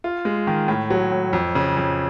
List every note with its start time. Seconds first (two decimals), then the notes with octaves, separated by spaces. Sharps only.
0.04 F4
0.25 G#3
0.47 D#3
0.68 A2
0.90 F#3
1.12 A2
1.33 F2
1.55 C#3
1.77 F2